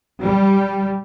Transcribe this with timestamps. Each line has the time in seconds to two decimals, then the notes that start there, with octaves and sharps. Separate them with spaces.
0.21 G3